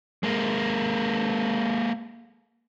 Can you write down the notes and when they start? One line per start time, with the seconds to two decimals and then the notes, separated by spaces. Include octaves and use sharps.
0.23 G#3 A#3